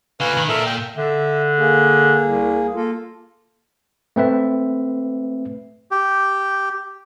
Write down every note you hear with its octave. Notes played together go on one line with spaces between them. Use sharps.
D3 F#4 B4 F5 G#5
D#3
A#2 A4 A#4 E5
G5
D3 E5
A#3 G#4
C2
A#3 F4 A4
A3 C4 B4 E5
G4